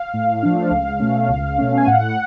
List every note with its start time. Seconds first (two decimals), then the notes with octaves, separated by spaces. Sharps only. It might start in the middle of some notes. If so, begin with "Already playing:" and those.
Already playing: F5
0.14 A2
0.43 F3 A3 D4
0.71 C#2
1.00 B2 A3 C#4
1.29 C#2
1.58 B2 A3 C#4
1.78 G#5
1.87 A2 F#5